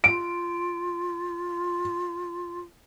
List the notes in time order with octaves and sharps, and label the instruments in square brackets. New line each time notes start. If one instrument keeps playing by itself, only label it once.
[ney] F4 [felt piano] D7